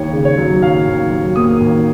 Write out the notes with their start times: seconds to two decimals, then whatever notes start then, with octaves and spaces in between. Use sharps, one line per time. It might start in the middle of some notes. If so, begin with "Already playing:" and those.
Already playing: D#2 C#5
0.13 C#3
0.25 C#5
0.38 F#3
0.62 D#2 F5
0.87 D#2
1.11 F#3
1.36 A#3 D#6
1.60 D#2